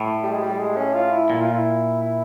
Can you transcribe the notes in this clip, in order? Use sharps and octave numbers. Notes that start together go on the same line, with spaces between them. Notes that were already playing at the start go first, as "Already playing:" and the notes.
Already playing: A2
G3
G#3
G3
G#3
C#4
F4
E4
A#2 E4
F4
E4
E4